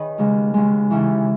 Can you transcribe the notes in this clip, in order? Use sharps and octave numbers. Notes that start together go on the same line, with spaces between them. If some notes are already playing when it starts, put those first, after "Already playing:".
Already playing: D#3 G#4 B4 C#5 D#5
D#2 C#3 G#3
D#2 C#3 G#3
D#2 C#3 E3